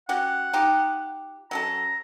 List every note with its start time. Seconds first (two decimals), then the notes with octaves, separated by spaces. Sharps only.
0.09 C#4 F#4 G4 F#5
0.53 D#4 F4 G4
1.51 F#3 C#4 A4 A#5